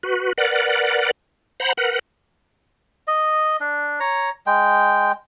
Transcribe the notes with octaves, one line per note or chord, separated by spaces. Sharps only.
F#4 B4
A#4 B4 D5 F#5
C5 F#5 A#5 B5
A#4 B4 F#5
D#5
D4
C#5 A#5
G#3 G5